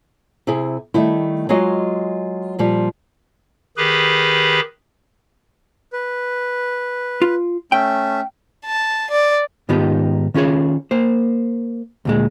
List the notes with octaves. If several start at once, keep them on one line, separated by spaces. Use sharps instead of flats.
C3 E4 G#4
D#3 G3 A3 E4
F#3 G#3 F4 F#4 D#5
A#2 F3 G3
D#3 G4 G#4 B4 B5
B4
F4
A3 C#4 E5 G5
A5
D5
G#2 D#3 B3 D#4 F4 G4
D#3 C#4 F4 G#4 C#5
A#3 C5
D2 A#2 G#3